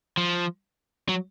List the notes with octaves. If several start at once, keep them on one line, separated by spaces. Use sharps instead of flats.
F3
F#3